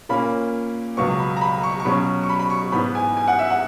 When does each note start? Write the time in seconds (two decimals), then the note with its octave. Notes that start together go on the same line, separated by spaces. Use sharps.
0.09 A#2 A#3 C#4 B5
0.97 C#2 B2 F#3 B3 C#6
1.19 B5
1.37 A#5
1.41 B5
1.63 C#6
1.80 C#6
1.85 B2 F#3 C#4 B5
2.23 C#6
2.29 B5
2.39 B5
2.50 C#6
2.72 G#2 E3 B3 B5
2.95 G#5
3.17 G#5
3.28 F#5
3.39 E5
3.50 F#5